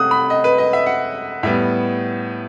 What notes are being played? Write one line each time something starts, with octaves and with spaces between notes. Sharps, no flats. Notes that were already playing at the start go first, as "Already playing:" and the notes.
Already playing: C3 A3 D#6 F#6
B5
D#5
B4
D#5
E5
F#5
A2 G3 B3 E5